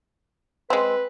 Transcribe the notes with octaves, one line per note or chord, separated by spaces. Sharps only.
G#3 C4 B4